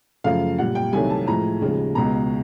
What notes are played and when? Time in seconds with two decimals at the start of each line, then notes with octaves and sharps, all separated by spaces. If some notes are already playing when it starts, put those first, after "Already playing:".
0.24 F#2 C#3 F3 A3 F5
0.58 A#2 G3 F#5
0.75 G5
0.93 C2 C3 D#3 F#3 A3 G#5
1.10 A5
1.27 A2 F3 G#3 A#5
1.61 D#2 C#3 F3 G#3
1.95 C#2 B2 G#3 A#5